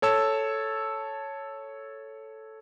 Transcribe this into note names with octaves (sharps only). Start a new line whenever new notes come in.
A4 C#5 A5 E6